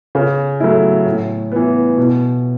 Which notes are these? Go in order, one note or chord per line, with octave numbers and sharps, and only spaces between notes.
C#3
F#3 A3 E4
A2
E3 B3
B2